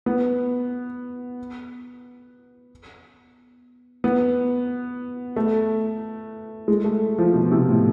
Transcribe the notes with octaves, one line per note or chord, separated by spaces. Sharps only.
B3
B3
A3
G#3
A3
F3
B2
C3
A2